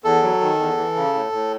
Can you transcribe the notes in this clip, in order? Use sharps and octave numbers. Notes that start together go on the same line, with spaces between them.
E2 A4
F#3
D#3
E2
E3
C#3
A2
A2